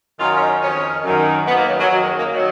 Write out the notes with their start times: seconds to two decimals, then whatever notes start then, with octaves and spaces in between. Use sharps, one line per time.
0.19 F#2 D#3 F4
0.35 C#4
0.40 D#4
0.62 F2 D#3 C#4
1.04 F#2 D#3
1.47 F#2 D#3 B3
1.58 A#3
1.68 F#3
1.79 F#3
1.90 F#2 D#3 F#3
2.04 G#3
2.18 A#3
2.33 D#3 F#3